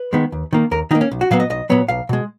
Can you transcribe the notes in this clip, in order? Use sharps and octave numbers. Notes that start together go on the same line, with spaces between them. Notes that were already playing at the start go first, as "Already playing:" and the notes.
Already playing: B4
D#3 G#3 B3
D#2
D#3 A#3
D#2 A#4
D#3 A#3 D#4
C#4
B1
F#4
A#2 F#3 B3 F5
D#5
B1 D#5
A#2 F#3 B3 C#5
B1 F5
B2 G#3